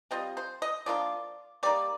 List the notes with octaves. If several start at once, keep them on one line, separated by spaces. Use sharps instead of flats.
G3 C4 F4 D#5
C5
D#5
F3 A#3 D4 F4 D5
G3 A#3 D#4 D5